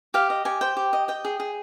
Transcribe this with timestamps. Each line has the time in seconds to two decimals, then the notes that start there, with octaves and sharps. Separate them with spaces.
0.14 G4 F5
0.30 D#5
0.45 G4 G#5
0.61 C5 G5
0.77 G4
0.93 D#5
1.08 D#5 G5
1.25 G#4
1.40 G#4